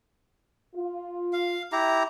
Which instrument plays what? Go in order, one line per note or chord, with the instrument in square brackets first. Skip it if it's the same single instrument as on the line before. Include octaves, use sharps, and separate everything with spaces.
[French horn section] F4
[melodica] F5
E4 G4 A#5